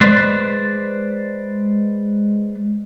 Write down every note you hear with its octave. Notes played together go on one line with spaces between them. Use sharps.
G#3 B4 C5 D5